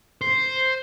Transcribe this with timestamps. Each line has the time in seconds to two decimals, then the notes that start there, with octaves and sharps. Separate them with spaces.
0.22 C5